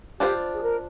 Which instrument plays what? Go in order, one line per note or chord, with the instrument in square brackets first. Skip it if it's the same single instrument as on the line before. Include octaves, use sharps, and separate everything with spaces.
[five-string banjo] D4 F4 C5 [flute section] G4
[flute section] G#4
A#4